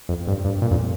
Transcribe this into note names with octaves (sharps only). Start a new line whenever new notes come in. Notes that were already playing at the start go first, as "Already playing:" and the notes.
F2
G2
G2
A#2
F2